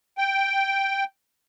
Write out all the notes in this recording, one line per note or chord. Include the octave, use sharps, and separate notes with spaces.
G5